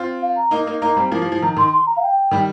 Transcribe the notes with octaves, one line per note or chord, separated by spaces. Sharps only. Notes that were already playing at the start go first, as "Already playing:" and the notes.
Already playing: C4 F4
F5
A#5
A#3 D#4
A#3 D#4
A#3 D#4 A#5
G3 C4
F3 A#3
F3
F3
D#3 A#5
D#3 C6
C6
A#5
F5
G5
D#3 G3